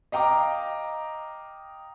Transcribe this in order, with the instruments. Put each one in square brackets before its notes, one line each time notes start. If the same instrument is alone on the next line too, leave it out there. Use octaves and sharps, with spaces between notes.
[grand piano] D#5 F5 G5 A#5 D6